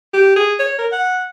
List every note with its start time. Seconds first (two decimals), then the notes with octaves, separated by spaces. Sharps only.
0.13 G4
0.36 G#4
0.59 C#5
0.78 A#4
0.92 F#5